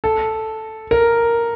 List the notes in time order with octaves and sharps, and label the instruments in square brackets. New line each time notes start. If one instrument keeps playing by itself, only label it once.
[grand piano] A4
A#4